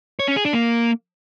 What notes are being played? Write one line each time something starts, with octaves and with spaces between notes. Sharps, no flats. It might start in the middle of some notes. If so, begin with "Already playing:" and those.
C#5
C#4
G#4
D4
A#3